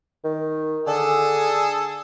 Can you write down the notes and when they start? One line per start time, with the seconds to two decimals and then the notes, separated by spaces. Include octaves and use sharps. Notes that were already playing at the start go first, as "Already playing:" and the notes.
0.25 D#3
0.87 D3 G#4 A4